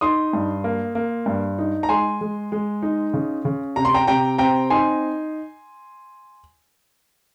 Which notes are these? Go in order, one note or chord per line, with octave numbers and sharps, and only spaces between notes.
D#4 C6 D#6
G2
A#3
A#3
G2
D#4
A#5
G#3 G#5 C6
G#3
G#3
D#4
C#3
C#3
C3 A#5
C6
G5 A#5
C3 G5 A#5
C4 G5 A#5
D#4 G#5 C6